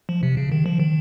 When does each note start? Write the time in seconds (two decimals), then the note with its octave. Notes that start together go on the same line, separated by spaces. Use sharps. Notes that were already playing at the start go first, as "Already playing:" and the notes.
0.09 F3
0.23 C3
0.37 C#3
0.52 D#3
0.66 F3
0.80 D#3